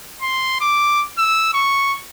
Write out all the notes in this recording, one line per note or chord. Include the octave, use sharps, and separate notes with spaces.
C6
D6
E6
C#6